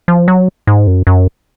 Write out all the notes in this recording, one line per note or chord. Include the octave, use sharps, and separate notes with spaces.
F3
F#3
G#2
F#2
F#2